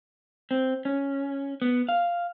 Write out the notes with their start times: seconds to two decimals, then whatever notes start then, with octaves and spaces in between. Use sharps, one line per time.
0.51 C4
0.85 C#4
1.62 B3
1.89 F5